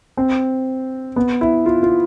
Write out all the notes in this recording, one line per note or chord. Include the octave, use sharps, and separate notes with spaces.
C4
B3
E4
F4
F4